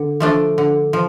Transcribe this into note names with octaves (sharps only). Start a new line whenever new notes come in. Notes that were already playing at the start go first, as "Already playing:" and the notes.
Already playing: D3
F3 A3 D4
D3
F3